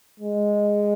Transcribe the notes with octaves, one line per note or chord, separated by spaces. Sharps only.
G#3